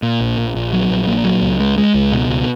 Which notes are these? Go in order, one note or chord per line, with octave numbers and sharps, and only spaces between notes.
A#2
A#1
A#1
A#1
F#3
A#1
A#2
F#3
C#2
G#3
G#3
C#2
B2
C#2